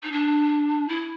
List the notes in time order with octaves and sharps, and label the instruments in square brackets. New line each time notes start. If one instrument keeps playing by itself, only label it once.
[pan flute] D#4
D4
E4